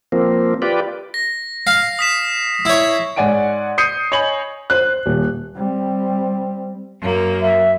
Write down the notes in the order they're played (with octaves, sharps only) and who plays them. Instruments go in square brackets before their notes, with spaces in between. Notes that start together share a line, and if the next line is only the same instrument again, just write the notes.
[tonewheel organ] F3 A#3 C4
F4 G4 B4 D5
[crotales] A#6
[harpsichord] F5 [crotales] C7
[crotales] D#6 B6 E7
[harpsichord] E4 C#5
[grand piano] G#2 C#5 D5 F#5 G#5 D7
D#6 G6 C7 C#7 D#7
C#5 D#5 G#5 B5 F#7
[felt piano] C5 F#6
D#1
[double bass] G3 C4
[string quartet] F#2 A#3
[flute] E5